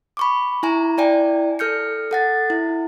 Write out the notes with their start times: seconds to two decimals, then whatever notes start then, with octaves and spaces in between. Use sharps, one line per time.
0.17 B5 C#6 D6
0.63 E4 G#5 A#5
0.98 E4 D5 G5 G#5
1.59 A4 F6 G6 C#7
2.11 A4 F#5 A6
2.50 E4